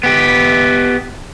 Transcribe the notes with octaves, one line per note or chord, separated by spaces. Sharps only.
B3 G4